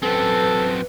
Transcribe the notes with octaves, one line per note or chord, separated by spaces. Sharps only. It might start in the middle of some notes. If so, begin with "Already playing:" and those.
F#2 C4 A4 B4